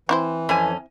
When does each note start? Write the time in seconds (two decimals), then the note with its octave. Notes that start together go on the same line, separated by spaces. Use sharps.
0.09 E3 C4 E4 C5
0.49 F2 C#4 G#5